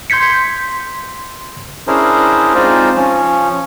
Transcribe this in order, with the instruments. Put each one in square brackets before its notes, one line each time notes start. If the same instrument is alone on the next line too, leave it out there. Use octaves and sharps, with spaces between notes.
[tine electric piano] C6 G6 G#6 B6 C#7
[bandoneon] C#4 D4 E4 G#4 A#4 C5
G#3 C4 D#4 F4 C5 D5
F3 C#4